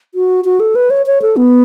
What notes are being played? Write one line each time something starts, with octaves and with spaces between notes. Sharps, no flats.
F#4
F#4
A4
B4
C#5
C#5
A4
B3